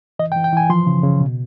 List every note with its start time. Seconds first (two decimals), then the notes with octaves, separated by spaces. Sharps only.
0.19 E3 D#5
0.32 G5
0.36 E3
0.44 G5
0.53 E3 G#5
0.70 F3 C6
0.87 C#3
1.04 C#3
1.21 B2